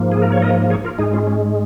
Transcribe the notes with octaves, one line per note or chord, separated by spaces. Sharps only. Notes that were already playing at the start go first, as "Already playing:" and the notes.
Already playing: G#2 F3 A#3
G#4
A#4
C#5
A#4 D#5
G#4 C#5
F4 A#4
G#2 G#3 D#4 G#4
C#4 F4
C#4